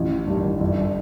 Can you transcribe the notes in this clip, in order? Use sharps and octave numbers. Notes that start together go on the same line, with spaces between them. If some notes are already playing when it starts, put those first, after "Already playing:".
Already playing: A1
G2 D#3
G1